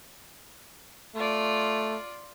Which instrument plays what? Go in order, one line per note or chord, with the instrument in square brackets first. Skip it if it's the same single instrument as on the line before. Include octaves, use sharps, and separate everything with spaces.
[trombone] A3 [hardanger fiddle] F4 D5